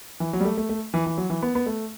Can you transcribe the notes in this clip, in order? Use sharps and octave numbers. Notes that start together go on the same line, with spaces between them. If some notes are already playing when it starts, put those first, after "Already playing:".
E3
F#3
G3
A3
A3
A3
E3
E3
F#3
E3
B3
B3
A3